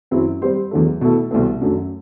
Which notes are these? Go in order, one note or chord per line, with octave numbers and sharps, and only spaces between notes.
F#2 F#3 C4 E4
G3 C4 G4 C5
E2 D3 F#3 A3
B2 A3 E4 A4
C2 B2 A3 C4
F#2 D3 F#3 A3